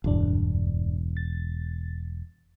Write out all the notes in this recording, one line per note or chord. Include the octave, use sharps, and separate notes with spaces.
E1 D2 G2 D4
A6